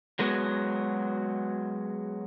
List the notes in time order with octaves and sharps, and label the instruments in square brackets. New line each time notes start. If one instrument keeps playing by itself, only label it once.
[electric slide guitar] F#3 G#3 B3 F#4